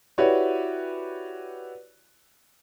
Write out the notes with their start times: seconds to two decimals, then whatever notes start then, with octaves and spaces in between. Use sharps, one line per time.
0.18 E4 F#4 G4 B4 C#5 D5